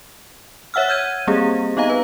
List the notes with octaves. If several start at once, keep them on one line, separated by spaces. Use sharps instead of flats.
C#5 E5 F#5 E6 F6
F6 G6 G#6 D#7
G3 A#3 C4 G4 G#4
B3 D#4 D#5 F5 A#5
B4